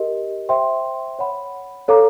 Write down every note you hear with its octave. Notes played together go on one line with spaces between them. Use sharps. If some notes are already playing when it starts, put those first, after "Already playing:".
Already playing: G4 A#4 D#5
C5 E5 G5 C6
C#5 F#5 B5
A4 C#5 F5 A#5 D6